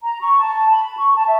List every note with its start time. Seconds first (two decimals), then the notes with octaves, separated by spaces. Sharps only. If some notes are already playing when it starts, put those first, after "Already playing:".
0.01 A#5
0.21 C#6
0.39 A5
0.70 B5
0.97 C#6
1.15 A5
1.26 E5